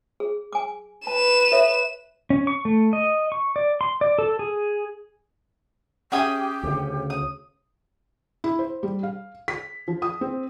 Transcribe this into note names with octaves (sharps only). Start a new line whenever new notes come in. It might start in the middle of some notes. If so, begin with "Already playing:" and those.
G#4
G#5 D6
B4 A5 E7
A4 C#5 E5
C#4
C#6
A3
D#5
C#6
D5
C6
D5
A4
G#4
C#4 G4 G#4 E5 G5 G#5 D#6
D2 C#3
D#6
E4
C5
G3
F5
B6
F3
D#6
C4